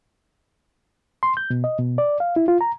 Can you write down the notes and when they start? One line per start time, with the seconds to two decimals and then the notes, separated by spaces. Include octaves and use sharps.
1.23 C6
1.37 G6
1.50 B2
1.64 D#5
1.78 B2
1.98 D5
2.20 F5
2.36 E4
2.48 F4
2.61 A#5